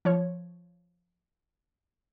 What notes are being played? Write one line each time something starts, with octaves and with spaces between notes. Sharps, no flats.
F3 C#5